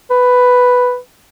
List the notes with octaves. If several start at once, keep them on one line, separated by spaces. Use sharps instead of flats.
B4